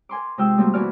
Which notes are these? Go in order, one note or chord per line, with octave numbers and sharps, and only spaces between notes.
A#4 G#5 C6 D6
C3 G#3 F4 G5 E6
F3 G3 A3 A#3 C4 F#4
B2 E3 F#4 D5 G#5 F6